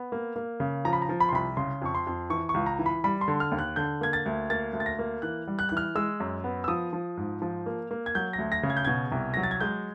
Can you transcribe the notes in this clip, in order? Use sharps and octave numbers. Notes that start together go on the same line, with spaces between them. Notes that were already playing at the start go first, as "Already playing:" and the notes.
Already playing: B3
A#3
A#3
C#3
F3 A#5
B5
A#5
F3
B5
C6
C2 B5
C#3 C6
F2 C#6
C6
F2
E3 C#6
C#6
C#2
A#5
E3
B5
G3 B5
C6
D3
F6
D#2
F#6
D3 G6
A#3 G#6
A6
D2
A#3 A6
D2
A6
A#6
A#3
E3 F#6
G3
F#6
F#6
E3 F6
G#3 E6
F#2
B3
E6
F3 D#6
F3
G#2
F3
A#3
A#3
G#6
F#3 G6
A#6
D2
A#6
C#3
G#6
G6
B2 G#6
C2
F#3 A#6
A6
G#6
G#3 G6